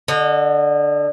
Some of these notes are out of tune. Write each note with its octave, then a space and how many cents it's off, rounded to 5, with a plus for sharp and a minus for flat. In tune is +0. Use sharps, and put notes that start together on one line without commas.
D3 +0 D#5 -30